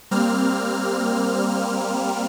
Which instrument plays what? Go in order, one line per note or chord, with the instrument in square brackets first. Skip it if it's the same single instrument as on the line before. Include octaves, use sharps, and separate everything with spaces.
[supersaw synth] G3 A#3 C4 F6